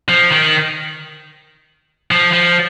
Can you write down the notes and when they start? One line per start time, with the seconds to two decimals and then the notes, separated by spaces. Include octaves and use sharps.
0.09 F3
0.32 D#3
2.11 F3
2.33 F3